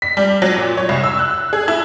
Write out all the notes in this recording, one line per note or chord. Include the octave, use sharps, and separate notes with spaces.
B6
G3
F#3
A#2
C#5
C2
E6
F#6
G#4
E4